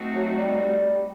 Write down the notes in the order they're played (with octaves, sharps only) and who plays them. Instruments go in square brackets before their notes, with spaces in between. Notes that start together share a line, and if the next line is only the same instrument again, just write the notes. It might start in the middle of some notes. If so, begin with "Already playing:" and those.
Already playing: [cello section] A3 C4 D#4 F#4
[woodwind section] F#3
G3